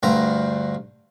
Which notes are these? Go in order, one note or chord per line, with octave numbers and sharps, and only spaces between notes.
D2 G2 A#5 C6